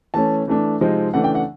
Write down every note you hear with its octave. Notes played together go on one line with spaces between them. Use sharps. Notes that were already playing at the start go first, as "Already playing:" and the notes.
E3 A3 C#4 A5
E3 A3 D4
C3 F3 G#3 C4 D#4
C#3 E3 A3 D4 F#5
G5
F#5